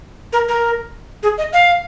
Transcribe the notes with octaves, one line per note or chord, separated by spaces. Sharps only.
A#4
A#4
G#4
D#5
F5